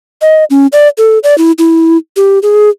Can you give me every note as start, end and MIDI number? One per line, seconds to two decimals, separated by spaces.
0.21 0.44 75
0.50 0.67 61
0.72 0.88 74
0.98 1.19 69
1.23 1.37 74
1.38 1.51 64
1.58 1.97 64
2.16 2.39 67
2.43 2.69 68